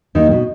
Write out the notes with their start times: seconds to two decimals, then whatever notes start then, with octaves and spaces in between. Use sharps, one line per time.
0.15 D#2 D#3
0.31 B2